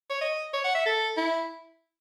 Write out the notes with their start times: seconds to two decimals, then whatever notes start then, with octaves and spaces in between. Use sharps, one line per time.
0.10 C#5
0.21 D#5
0.53 C#5
0.64 F#5
0.75 E5
0.86 A4
1.17 E4